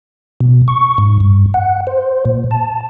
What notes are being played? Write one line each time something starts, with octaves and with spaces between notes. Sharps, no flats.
B2
C#6
G#2
G2
F#5
C5
A#2
A5